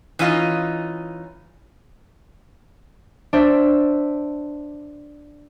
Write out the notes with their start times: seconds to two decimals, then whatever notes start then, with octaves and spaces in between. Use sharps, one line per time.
0.19 E3 C#4 D#4 F4 D#5
3.33 D4 C5 E5